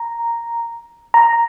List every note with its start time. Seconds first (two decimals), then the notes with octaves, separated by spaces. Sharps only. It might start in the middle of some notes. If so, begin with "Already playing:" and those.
Already playing: A#5
1.14 A#5